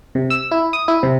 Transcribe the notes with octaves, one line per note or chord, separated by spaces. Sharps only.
C3
E6
E4
D#6
E4
C3